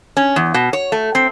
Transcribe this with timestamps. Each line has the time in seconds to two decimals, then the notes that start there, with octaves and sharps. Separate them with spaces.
0.17 C#4
0.36 E2
0.54 B2
0.73 C#5
0.92 A3
1.15 C4